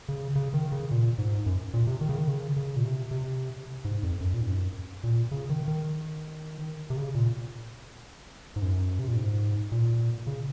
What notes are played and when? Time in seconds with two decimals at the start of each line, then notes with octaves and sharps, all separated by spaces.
0.09 C#3
0.36 C#3
0.54 D#3
0.72 C#3
0.91 A#2
1.18 G#2
1.46 F#2
1.74 A#2
1.87 C3
2.01 D#3
2.09 C#3
2.18 D#3
2.28 C#3
2.57 C#3
2.76 A#2
2.83 C3
3.11 C3
3.85 G#2
4.03 F2
4.21 F#2
4.34 A#2
4.41 G#2
4.48 F#2
5.04 A#2
5.31 C#3
5.49 D#3
5.68 D#3
6.90 C3
6.96 C#3
7.15 A#2
8.56 G#2
8.62 F#2
8.99 C3
9.08 A#2
9.16 G#2
9.72 A#2
10.27 C#3